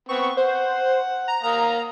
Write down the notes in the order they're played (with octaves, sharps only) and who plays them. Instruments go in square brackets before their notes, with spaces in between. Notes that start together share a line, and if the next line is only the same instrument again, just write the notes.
[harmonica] B3 C4 [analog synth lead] C#6
[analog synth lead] C5 [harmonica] F#5
[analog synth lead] A#5
[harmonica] A#3 F5 D#6 [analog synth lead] A#5